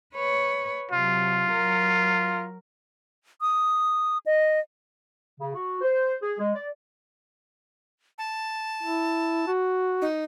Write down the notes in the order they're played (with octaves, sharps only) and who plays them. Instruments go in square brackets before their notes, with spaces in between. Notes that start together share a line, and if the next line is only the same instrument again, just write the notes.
[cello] B4 C#5
[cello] C3 F#3 [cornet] F4
[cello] F#3 A#4
[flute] D#6
D#5
[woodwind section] C#3
F#4
C5
G#4
G#3
D5
[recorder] A5
[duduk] E4
F#4
[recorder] D#4